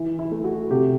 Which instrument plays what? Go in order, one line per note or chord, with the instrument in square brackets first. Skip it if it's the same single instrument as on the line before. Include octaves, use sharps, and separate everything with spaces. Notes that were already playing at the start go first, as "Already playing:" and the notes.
Already playing: [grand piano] E3
E4
A3
F#4
C3 G4